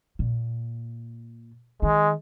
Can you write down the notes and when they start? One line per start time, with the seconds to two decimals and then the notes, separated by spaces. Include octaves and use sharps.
0.19 A#2
1.82 D#3 G#3